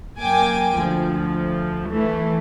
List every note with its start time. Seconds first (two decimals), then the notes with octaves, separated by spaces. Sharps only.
0.19 F#2 A#3 G5 G#5 D6
0.78 D2 F3
1.90 E3 A3